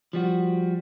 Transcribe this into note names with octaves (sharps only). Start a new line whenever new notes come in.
F3 G3 F#4